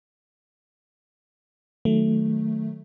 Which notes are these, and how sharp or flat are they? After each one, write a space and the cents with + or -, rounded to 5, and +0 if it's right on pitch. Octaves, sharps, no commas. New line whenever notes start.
D#3 +0 F#3 +0 A3 +0